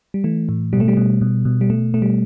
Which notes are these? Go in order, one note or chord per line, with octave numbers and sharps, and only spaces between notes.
G3
E3 A3
A2
B2 G3
A3
G3
B2
B2
B2
G3
B2 A3
B2 A3
G3